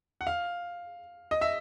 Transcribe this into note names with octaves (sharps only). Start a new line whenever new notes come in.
F#5
F5
D#5
E5